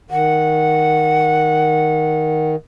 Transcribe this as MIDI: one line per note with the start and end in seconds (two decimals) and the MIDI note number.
0.10 2.56 51
0.10 2.51 78